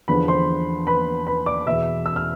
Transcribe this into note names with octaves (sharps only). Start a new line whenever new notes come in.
E2 D3 F3 B4 B5
C5 C6
B4 B5
B4 B5
D5 D6
E2 B2 E5 E6
E6
F6